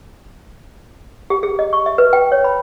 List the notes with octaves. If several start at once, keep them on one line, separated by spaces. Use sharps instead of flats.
G4
G#4
D#5
C#6
E5
B4
G5
C#5
B5